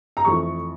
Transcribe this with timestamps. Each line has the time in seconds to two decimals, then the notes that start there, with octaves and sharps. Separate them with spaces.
0.17 A#5
0.25 F2 E3 A3 C#6